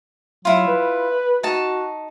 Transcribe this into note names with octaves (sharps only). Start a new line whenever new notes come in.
F#3 E4 F4
B4
D#4 F#4 A5